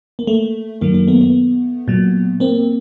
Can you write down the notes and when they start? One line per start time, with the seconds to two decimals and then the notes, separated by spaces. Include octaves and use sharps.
0.19 A#3
0.27 A3
0.81 F#2 D#3 F#3 A#3
0.94 A#3
1.08 A3 B3
1.21 A3 B3
1.88 A#2 F#3
2.40 A#3 C4